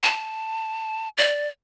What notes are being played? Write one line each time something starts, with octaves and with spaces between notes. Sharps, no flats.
A5
D5